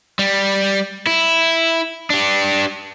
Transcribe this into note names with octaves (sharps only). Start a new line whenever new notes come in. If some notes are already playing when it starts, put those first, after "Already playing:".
G3
E4
D4 G4